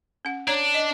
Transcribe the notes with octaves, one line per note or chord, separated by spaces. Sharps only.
C#4 F#5
D4 C#5 A#5
D#5